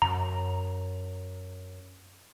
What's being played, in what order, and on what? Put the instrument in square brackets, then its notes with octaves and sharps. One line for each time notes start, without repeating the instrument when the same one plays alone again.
[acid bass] F#2 [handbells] A#5